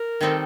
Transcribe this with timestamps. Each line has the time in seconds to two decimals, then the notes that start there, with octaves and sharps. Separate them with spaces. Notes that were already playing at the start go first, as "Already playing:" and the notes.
Already playing: A#4
0.21 D#3 G3 C4 D#4 A4